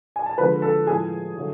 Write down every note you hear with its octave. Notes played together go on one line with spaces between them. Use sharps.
G#5
A5
D3 F3 G#3 B4 B5
A4 A5
A2 F3 G#3 G#4 G#5
D3 F#3 A3